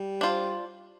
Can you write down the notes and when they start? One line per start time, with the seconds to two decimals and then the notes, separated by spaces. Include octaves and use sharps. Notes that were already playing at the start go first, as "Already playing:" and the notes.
Already playing: G3
0.21 D4 F4 C5